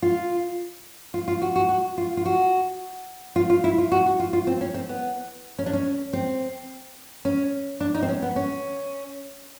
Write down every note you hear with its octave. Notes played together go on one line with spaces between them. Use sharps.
F4
F4
F4
F#4
F#4
F#4
F4
F4
F#4
F4
F4
E4
F4
F#4
F#4
F4
F4
C4
C#4
C4
B3
C#4
D4
C#4
C4
C#4
D4
D#4
C4
C#4
B3
C#4